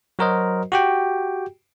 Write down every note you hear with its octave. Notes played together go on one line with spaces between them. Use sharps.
F#3 F#4 A#4 C5 D#5
F#4 G4 G5